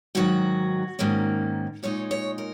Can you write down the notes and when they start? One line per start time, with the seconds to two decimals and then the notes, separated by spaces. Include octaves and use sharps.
0.15 G#2 D#3 F#3 F#4
0.99 G#2 D#3 A#3 C#4
1.83 A#2 G#3 D#4 C#5
2.11 C#5
2.38 A#4